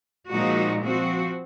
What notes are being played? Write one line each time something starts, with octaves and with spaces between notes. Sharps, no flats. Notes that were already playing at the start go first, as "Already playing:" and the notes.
A#2 F3 G#3 D#4 F#4
F3 C4 F#4